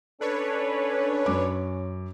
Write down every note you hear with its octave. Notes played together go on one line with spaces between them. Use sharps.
C#4 D4 A4 B4 C#5
F#2 D6